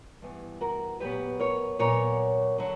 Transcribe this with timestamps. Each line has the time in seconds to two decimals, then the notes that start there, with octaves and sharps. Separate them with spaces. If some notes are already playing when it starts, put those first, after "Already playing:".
0.22 G2 E3 B3
0.61 F#4 A#4
1.00 A#2 F#3 B3 G4 B4
1.40 A#4 C#5
1.79 A#2 F#3 B3 A#4 C#5
2.58 D3 F#3